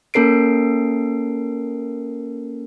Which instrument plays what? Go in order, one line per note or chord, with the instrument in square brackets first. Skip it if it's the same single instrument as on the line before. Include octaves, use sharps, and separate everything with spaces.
[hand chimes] A#3 C#4 A4 A#4 C7 D7